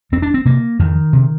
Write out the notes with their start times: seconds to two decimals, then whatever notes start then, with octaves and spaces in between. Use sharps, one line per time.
0.12 F2 C4
0.22 D4
0.34 C4
0.45 C3 A#3
0.79 F2 D#3
1.13 C3